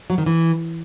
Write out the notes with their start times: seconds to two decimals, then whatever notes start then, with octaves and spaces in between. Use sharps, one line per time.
0.10 F#3
0.18 D#3
0.26 E3